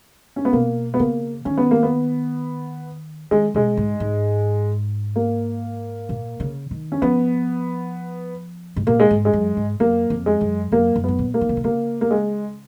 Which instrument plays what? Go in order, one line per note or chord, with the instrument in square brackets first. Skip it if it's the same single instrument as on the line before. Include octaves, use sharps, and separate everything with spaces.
[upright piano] C#4
B3
[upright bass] B2 [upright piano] A#3
[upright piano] B3
[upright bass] C#3 [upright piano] A#3
[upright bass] D#3 [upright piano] C#4
[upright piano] B3
A#3
B3
[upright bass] D#3 [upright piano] G#3
[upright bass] B2 [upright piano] G#3
[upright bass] G#2
G#2
[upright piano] A#3
[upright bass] A#2
C#3
D#3
[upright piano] C#4
[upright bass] F3 [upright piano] B3
[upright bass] G#2
[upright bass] A#2 [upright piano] A#3
[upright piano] G#3
[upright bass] G#2
[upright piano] G#3
[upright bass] F#2
G#2
[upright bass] F#2 [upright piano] A#3
[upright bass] F2
[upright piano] G#3
[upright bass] F#2
[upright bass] F#2 [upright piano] A#3
[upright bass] F#2
[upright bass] G#2 [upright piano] B3
[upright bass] A#2
[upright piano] A#3
[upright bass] D#3
C#3
B2
[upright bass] C#3 [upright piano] A#3
[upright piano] A#3
G#3